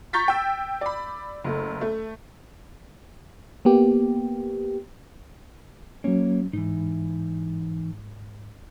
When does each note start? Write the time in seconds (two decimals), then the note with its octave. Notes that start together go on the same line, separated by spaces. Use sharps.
0.13 A#5 C#6 G6 A6 B6
0.28 G5 E6
0.81 D5 B5
1.44 F#1 A3
1.81 A3
3.65 A#3 B3 G4
6.04 F#3 A#3 C#4 C#5
6.53 G#2 E3 D#4